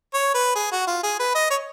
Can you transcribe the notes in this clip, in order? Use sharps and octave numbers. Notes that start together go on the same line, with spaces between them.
C#5
B4
G#4
F#4
F4
G#4
B4
D#5
C#5